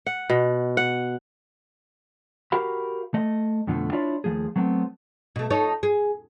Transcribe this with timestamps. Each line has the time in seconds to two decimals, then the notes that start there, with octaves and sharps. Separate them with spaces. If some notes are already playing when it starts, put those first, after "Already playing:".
0.06 F#5
0.30 B2
0.77 F#5
2.52 F#4 G4 A#4 F5 B5
3.14 A3 D#5
3.67 F2 B2 D3 F3 G3 A3
3.93 D4 E4 F4 C#5 D5
4.24 D#2 F3 A3 G#4
4.56 F#3 A3 B3 C4
5.36 B2 A3
5.50 D#4 A4 C#5
5.83 G#4